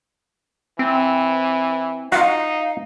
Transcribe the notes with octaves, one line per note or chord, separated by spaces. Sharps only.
E3 C4
D#4 F4 F#4 F5